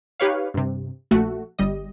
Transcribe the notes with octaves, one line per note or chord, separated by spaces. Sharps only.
D#4 G4 B4 C#5 F5
G2 C3
A#1 A3 F#4
G1 G3 D#5